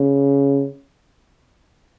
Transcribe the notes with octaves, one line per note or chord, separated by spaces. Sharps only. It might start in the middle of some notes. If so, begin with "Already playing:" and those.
Already playing: C#3